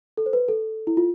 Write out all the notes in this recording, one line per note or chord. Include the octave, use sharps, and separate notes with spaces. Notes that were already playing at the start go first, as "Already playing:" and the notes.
A4
C5
B4
A4
E4
F4